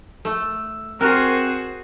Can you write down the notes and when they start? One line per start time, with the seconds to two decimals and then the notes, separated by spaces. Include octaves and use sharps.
0.25 A3 E6
1.01 C4 F#4 G#4 A#4 C5 F#6